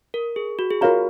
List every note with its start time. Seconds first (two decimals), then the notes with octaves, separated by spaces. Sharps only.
0.14 A#4
0.36 G#4
0.59 F#4
0.70 G#4
0.81 F4 F#4 A#4 C#5 F5 A#5